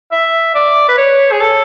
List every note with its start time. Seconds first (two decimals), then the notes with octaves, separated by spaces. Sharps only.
0.12 E5
0.55 D5
0.88 B4
0.97 C#5
1.32 G#4
1.41 A4